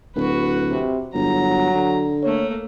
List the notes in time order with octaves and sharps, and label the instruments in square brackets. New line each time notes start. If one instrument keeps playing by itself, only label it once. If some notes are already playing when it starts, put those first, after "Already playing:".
[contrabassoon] D1 [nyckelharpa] F#4 B4
[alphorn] C3
[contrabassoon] G1 [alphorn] F#3 [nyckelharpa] A#5
[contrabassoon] D3
[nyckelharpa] A3 A#3 [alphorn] C#5